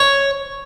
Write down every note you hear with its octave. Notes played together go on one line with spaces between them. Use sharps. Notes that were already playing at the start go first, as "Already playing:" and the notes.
Already playing: C#5